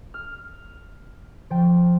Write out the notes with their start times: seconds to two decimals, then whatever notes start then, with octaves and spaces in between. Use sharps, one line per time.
0.14 F6
1.50 F3 G5